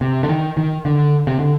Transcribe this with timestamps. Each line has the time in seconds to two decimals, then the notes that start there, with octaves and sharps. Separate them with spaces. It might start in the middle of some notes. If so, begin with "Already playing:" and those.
0.01 C3
0.23 D3
0.29 D#3
0.57 D#3
0.85 D3
1.27 C3
1.39 D3